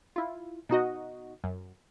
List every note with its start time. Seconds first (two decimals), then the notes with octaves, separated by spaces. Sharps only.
0.16 E4 F4
0.69 B2 D#4 F#4 D#5
1.44 F#2